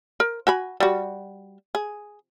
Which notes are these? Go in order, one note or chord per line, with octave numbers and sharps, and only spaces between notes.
A#4
F#4 G#5 B5
G3 F#4
G#4